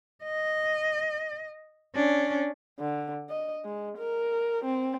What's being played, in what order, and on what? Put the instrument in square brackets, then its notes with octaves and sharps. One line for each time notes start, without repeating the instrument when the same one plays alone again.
[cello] D#5
C#4 D4
[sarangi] D3
D#5
G#3
A#4
C4